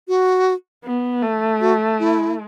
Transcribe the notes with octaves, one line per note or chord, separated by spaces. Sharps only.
F#4
B3
A3
F#4
E4